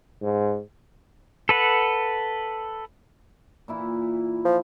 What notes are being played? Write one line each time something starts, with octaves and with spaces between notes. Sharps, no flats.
G#2
A4 B4 F#5
A#2 E3 E4
F3